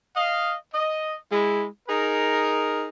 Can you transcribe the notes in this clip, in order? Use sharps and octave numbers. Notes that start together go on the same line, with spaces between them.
D#5 F5
D#5
G#3 E4
D#4 G#4 A#4